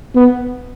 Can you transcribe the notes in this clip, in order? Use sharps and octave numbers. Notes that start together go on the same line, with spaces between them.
B3